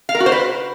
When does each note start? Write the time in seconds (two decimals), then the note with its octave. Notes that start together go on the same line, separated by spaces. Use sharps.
0.09 F5
0.15 A#4
0.20 F#4
0.26 C5
0.32 B4